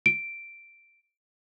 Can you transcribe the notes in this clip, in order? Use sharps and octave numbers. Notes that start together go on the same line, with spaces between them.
D7